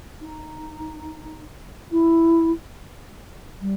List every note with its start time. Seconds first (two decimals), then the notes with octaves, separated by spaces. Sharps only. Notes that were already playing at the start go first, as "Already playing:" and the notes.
0.21 D#4
1.91 E4
3.61 G3